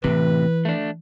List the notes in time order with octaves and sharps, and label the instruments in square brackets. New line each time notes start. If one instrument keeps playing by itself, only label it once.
[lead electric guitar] A2 C3 [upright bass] E3 [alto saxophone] B4
[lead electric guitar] A3 D4